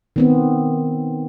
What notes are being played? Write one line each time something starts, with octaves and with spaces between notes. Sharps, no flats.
D#3 B3 C4